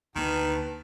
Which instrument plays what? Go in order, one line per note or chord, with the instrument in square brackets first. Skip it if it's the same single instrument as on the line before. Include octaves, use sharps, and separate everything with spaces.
[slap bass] D2 A#3 [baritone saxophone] D#3 [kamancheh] B4 A5